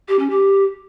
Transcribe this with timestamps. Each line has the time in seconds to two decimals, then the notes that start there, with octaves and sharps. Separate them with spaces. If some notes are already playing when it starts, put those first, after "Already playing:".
0.08 G4
0.19 C#4
0.30 G4